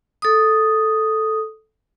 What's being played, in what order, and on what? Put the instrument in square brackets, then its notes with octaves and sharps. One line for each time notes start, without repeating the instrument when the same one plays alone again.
[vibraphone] A4 D#6